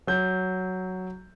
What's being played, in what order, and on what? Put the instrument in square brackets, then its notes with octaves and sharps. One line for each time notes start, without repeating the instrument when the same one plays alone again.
[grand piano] F#3 G6